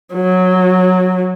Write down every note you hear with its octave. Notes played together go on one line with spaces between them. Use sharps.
F#3